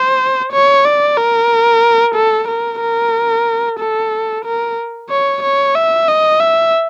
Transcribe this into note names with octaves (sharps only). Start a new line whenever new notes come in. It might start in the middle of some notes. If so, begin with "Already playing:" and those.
Already playing: C5
C#5
D5
A#4
A4
A#4
A#4
A4
A#4
C#5
C#5
E5
D#5
E5